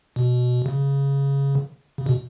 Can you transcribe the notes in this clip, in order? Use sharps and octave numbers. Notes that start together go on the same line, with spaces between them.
B2
C#3
C#3
B2